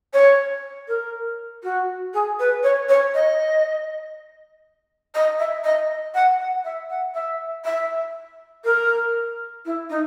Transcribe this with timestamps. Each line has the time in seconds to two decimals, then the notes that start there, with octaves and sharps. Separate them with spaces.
0.14 C#5
0.88 A#4
1.64 F#4
2.14 G#4
2.40 B4
2.63 C#5
2.89 C#5
3.14 D#5
5.15 D#5
5.39 E5
5.64 D#5
6.15 F#5
6.40 F#5
6.65 E5
6.90 F#5
7.14 E5
7.65 E5
8.65 A#4
9.65 E4
9.90 D#4